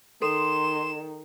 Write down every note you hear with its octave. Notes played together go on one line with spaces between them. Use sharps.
D#3 A4 C6 E7